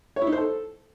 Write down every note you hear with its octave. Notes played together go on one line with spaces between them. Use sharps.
C#5
E4
D#4
C5
A4